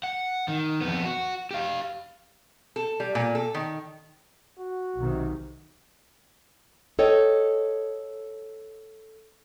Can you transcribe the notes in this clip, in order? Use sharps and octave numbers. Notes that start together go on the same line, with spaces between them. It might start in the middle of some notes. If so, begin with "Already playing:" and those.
F#5
D#3
F2 B3
F#4
G4 F5
A4
G3
A#2
A4
D#3
F#4
B1 C3 D#3
A4 C#5 D#5 G5